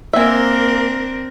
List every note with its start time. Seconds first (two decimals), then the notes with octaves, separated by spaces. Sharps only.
0.13 A#3 C4 D4 A#4 E5 G#5